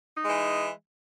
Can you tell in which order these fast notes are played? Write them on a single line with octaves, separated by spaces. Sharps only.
D#4 G#3 E3